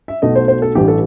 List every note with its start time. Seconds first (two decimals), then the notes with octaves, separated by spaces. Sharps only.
0.08 E5
0.22 B1 B2 A3 D#5
0.36 C5
0.48 C5
0.62 A4
0.75 A1 G2 E3 G4
0.88 A4